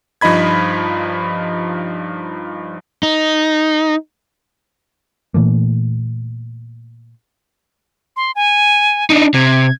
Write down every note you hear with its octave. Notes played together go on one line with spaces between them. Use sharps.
G2 F3 D#4 D#5 B5 G#6
D#4
A#2 E3 A3 A#3
C6
G#5
D4 D#4
C3 G#6